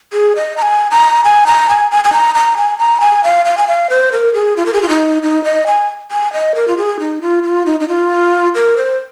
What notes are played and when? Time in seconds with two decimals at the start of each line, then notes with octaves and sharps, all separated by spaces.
0.13 G#4
0.36 D#5
0.57 A#5
0.62 G#5
0.91 A#5
1.24 G#5
1.47 A#5
1.69 G#5
1.91 G#5
2.04 G#5
2.13 A#5
2.35 A#5
2.57 G#5
2.79 A#5
3.01 G#5
3.24 F5
3.45 F5
3.58 G#5
3.68 F5
3.90 C5
4.12 A#4
4.34 G#4
4.57 F4
4.66 A#4
4.73 G#4
4.82 F4
4.89 D#4
5.23 D#4
5.44 D#5
5.67 G#5
6.12 G#5
6.33 D#5
6.55 A#4
6.68 F4
6.77 G#4
7.00 D#4
7.22 F4
7.43 F4
7.66 D#4
7.80 D#4
7.89 F4
8.55 A#4
8.77 C5